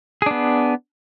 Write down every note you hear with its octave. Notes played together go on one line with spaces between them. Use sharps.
B3 D4 G#4